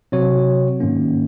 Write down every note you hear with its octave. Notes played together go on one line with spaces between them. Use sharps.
C3 F#3 C4 F#4 C#5
G#2 D#3 A#3 C#4